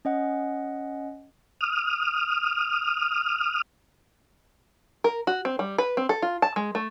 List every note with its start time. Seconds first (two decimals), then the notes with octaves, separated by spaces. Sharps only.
0.05 C#4 D#5 F#5
1.61 D#6 F6
5.04 A#4
5.27 F#4
5.45 C4
5.59 G3
5.78 B4
5.97 C4
6.09 A4
6.22 F4
6.42 A5
6.56 G#3
6.75 A3